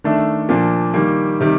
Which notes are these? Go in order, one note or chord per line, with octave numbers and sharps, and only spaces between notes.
D#3 A3 D4 A4
A#2 F3 A#3 D4
D#3 G3 A#3
C3 D#3 G3